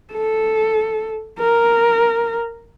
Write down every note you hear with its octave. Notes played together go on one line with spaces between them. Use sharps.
A4
A#4